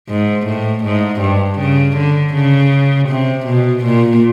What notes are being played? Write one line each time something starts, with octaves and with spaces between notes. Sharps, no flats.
G#2
A2
G#2
G2
C#3
D3
C#3
C3
B2
A#2